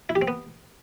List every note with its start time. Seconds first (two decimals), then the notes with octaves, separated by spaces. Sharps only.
0.09 E4
0.15 G4
0.22 C4
0.28 B3